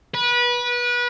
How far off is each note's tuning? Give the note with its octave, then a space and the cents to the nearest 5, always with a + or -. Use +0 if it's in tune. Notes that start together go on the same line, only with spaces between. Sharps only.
B4 -25